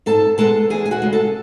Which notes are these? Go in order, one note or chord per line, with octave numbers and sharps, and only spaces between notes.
G#2 A4 A5
G#3 B3 A4 A5
E2 G#4 G#5
G#5
F#4 F#5
C#3 G#3
A4 A5